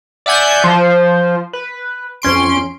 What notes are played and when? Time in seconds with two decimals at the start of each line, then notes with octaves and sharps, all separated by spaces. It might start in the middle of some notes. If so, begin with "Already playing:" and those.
0.26 D5 E5 F#5 G#5 G6
0.64 F3 C5
1.53 B4
2.22 F2 C#4 C6 D7